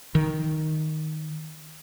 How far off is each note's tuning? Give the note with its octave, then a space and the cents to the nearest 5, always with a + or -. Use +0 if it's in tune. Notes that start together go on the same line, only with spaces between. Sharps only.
D#3 +0